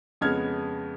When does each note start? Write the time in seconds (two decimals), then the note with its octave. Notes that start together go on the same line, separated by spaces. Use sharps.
0.21 F2 C#3 G#3 B3 F6 G#6